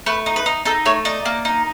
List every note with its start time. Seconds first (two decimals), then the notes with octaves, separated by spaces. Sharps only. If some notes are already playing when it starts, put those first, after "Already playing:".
0.06 A3 B4
0.26 D#4
0.36 B4
0.46 D#4
0.65 D#4 A4
0.85 A3 C#5
1.05 D#4 D5
1.25 A#3
1.45 D#4